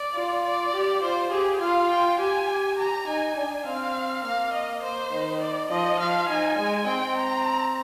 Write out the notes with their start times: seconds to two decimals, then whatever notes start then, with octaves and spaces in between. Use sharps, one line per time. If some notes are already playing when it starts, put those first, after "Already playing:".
Already playing: D5
0.15 F4
0.44 D5
0.74 G4
1.02 F4 C5
1.31 G4 G#4
1.61 F4 F5
1.90 G5
2.19 G4 G#5
2.78 G4 A#5
3.07 D#4 G#5
3.36 D4
3.66 C4 F5
4.24 A#3 F5
4.54 D#5
4.83 C5
5.12 D#3
5.41 D5
5.70 F3 D#5
5.99 F3 F5
6.29 D#4 G#5
6.58 G#3 G#5
6.87 C4 G5
7.17 A#5